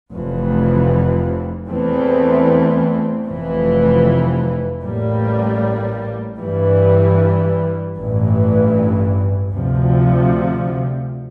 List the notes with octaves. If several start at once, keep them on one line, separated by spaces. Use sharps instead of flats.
F1 F2 E3
E2 E3 A3 C4
F1 F2 E3
A1 A2 G3 A#3
G2 E3 G3
A1 G2 E3
D2 C3 F3